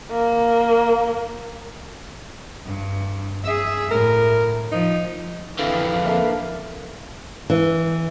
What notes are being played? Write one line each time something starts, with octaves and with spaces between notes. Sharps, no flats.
A#3
G2
G#4 E5
A2 A#4
F3 D#4
F2 D3 E3 B4 F5
A#3 A4 E5
E3